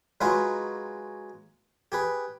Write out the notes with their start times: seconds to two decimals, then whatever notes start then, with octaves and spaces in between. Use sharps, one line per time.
0.21 F#3 G#3 D#4 F4 G#4 B4
1.92 G4 G#4 B4